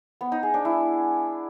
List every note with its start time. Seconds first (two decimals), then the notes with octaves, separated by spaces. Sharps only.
0.21 B3
0.32 D#4
0.43 G#4
0.54 D4
0.65 E4